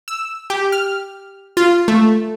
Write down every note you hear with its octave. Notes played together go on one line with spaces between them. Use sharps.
E6
G4
F6
F4
A3